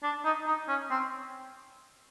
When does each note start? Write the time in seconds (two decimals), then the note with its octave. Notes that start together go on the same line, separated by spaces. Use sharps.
0.03 D4
0.25 D#4
0.47 D#4
0.68 C#4
0.91 C4